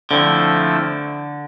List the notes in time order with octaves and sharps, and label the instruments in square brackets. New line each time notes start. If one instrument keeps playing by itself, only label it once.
[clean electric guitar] D3 [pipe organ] F3 A3 C4 E4